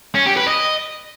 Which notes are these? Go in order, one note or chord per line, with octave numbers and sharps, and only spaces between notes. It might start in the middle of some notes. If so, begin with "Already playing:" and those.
C#4
G4
B4
D#5